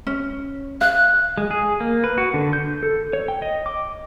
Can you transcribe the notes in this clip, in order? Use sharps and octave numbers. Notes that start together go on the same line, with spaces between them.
C#4
F5 F#6
G#3
G#4
A#3
B4
F#4
D3
G6
A4
C#5
G5
D#5
D6